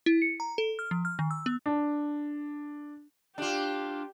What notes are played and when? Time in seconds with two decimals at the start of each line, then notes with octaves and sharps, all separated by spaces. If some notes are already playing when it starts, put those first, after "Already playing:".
0.06 E4
0.22 C#7
0.40 A#5
0.58 A4
0.79 F6
0.91 F3
1.05 F6
1.19 D#3
1.31 E6
1.46 B3
1.66 D4
3.38 D4 F4 G4